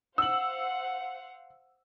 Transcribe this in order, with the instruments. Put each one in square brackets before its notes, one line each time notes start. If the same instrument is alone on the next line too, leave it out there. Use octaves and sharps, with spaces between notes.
[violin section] C5 F5 F#5 [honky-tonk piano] E6 F#7